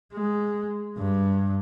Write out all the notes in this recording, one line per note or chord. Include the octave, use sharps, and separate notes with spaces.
G#3
G2